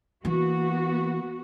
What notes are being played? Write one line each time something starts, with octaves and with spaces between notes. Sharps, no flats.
E3 A#3 B3 F#4